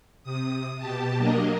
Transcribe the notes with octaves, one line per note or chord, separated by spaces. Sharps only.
C3 D#6
B2 G4 A5
F#3 A#3 D4 A#4 D#5